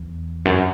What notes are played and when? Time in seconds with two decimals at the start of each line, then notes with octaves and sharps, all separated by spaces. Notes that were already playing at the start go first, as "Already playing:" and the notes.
Already playing: E2
0.45 F#2